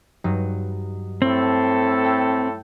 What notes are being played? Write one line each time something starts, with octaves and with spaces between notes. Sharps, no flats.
G2 F#3 D#4
A2 C4 A4
G5